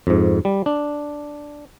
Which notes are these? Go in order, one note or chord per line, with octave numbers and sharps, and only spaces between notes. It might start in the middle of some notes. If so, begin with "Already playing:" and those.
F2 G#2
G3
D4